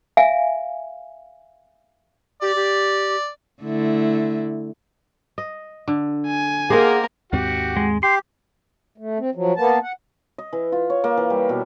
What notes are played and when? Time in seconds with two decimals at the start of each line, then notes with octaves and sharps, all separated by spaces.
0.17 E5 F5 G#5
2.42 G4 D5
2.56 G4
3.63 D3 A3 E4
5.38 D#5
5.88 D3
6.27 G#5
6.70 A#3 G4 G#4 A#4 C5 D#5 F#5
7.32 D#2 G#2 C4 F#4 G4 F#5
7.77 G#3
8.03 G4 C6
8.98 A3
9.19 C4
9.35 F3 F#3
9.57 A#3 B3 A5
9.83 F#5
10.38 D#5
10.53 E3
10.72 F4
10.90 C#5
11.04 A#3
11.17 E3
11.30 G3
11.49 B2